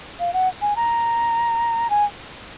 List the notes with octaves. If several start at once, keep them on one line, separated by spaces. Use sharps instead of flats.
F5
F#5
G#5
A#5
G#5